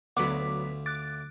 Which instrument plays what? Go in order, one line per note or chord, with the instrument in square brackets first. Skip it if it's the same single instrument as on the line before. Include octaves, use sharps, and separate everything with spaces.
[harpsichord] D2 F4 D5 [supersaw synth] F#3 B3 [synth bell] D6 B6
[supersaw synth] D6 [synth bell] F#6 A6